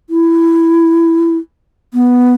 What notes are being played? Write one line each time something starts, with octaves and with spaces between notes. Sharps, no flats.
E4
B3